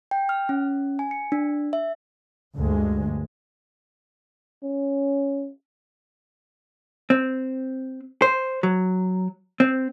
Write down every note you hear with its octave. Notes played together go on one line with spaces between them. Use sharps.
G5
F6
C#4
G#5
C#7
D4
E5
D2 G2 G#3
C#4
C4
C5
F#3
C4